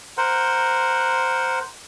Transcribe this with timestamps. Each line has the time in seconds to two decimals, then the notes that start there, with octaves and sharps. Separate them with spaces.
0.17 A#4 C5 F#5